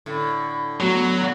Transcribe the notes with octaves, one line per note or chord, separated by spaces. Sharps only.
A2 D3
F#3 A3 B3 F#4